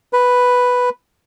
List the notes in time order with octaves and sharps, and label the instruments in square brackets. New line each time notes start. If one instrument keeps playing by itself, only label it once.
[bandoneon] B4